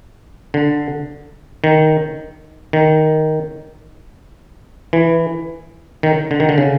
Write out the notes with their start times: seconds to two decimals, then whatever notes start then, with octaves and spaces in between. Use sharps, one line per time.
0.54 D3
1.64 D#3
2.73 D#3
4.93 E3
6.03 D#3
6.31 D3
6.40 D#3
6.49 D3
6.58 C#3